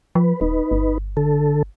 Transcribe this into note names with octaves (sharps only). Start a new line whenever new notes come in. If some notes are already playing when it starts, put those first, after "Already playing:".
F3 B4
D#1 D#4 B4
G1
D3 A4